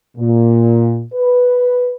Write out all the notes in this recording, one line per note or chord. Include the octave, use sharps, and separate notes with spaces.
A#2
B4